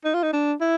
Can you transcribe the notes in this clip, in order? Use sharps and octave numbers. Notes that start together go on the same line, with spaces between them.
D#4
F4
D#4
D4
E4